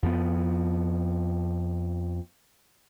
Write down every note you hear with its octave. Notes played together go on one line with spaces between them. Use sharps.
F2 F3 B3